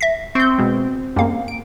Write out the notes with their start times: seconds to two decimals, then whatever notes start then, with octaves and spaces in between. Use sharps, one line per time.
0.01 E5 A#6 B6
0.35 C4 C#6 G6
0.58 B2 G#3
1.16 F#2 G3 G#3 A#3 F5
1.48 D7